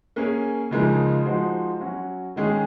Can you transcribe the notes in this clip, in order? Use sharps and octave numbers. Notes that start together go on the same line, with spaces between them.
A#3 C#4 G#4 C#5
C#3 F3 G#3 D#4 A#4
F3 G#3 D#4 F#4 C5
F#3 C#4 F#4
D#3 G#3 C#4 G#4